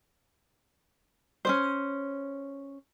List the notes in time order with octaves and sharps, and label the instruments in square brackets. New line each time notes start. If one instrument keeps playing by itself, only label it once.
[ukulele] C#4 D4 C5